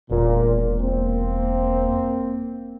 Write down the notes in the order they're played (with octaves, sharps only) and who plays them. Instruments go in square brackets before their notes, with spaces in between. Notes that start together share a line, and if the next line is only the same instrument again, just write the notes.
[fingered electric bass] E1 [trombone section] A#2
[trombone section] A#3 C4